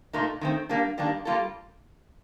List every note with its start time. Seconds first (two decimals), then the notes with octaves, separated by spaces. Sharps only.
0.13 A#2 A3 D#4 A#4
0.41 D#3 A3 C4
0.69 G3 A#3 D4
0.98 D#3 G3 A#3 D4
1.25 G3 A#3 F4 A4